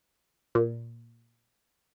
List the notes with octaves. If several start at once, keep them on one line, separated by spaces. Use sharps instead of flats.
A#2